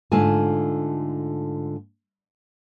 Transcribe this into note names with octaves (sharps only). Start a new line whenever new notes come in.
G#2 D3 A3 F4 G#5 A5